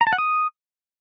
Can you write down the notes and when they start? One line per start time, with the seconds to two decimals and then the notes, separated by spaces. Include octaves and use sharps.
0.01 A#5
0.07 A5
0.13 F#5
0.18 D#6